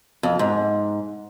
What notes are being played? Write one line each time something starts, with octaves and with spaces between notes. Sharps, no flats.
F2
G#2